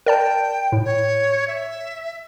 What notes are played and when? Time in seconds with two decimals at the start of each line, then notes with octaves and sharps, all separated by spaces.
0.06 A#4 D5 G5 A5
0.72 A2
0.85 C#5
1.48 E5